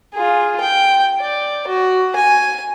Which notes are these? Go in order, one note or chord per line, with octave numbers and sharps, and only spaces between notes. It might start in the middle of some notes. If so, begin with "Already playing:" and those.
F4 G#4
G5
D5
F#4
G#5